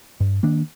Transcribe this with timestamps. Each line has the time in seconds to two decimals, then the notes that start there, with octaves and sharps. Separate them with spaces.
0.20 G2
0.43 D#3 A#3 D4